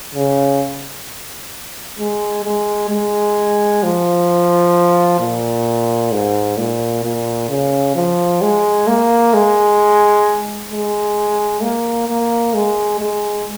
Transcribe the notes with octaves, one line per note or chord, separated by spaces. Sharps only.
C#3
G#3
G#3
G#3
F3
A#2
G#2
A#2
A#2
C#3
F3
G#3
A#3
G#3
G#3
A#3
A#3
G#3
G#3